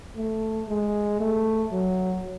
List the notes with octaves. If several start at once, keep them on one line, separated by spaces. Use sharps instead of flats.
A3
G#3
A3
F#3